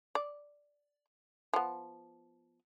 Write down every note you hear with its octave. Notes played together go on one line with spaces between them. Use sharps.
D5
F3 B3